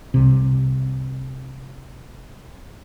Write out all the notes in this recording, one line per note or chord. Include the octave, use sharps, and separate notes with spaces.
C2 C3